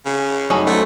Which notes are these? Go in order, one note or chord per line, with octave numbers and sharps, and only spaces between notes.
C#3
F#2 G3 A3 C#4 D#4 F#4 G#4 A4
F#3 A3 C5 F#5 G#5